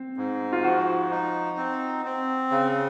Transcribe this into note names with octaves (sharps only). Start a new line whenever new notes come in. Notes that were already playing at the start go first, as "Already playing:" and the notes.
Already playing: C4
G#2
F4
F3 F#4
D#4
C4
C4
C#3